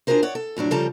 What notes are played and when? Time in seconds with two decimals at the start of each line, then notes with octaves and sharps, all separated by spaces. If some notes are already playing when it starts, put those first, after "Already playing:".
0.07 D4 F4 F#4 G#4 A#4 C5
0.22 C#5 D5 F#5
0.35 A4
0.57 F2 A2 F#3 D4
0.71 C#3 F3 G3 A4 A5 A#5